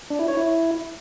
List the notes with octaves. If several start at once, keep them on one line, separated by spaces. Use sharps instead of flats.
D4
E4
C#5
E4